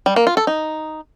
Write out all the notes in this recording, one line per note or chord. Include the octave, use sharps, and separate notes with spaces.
G3
A#3
F4
A4
D#4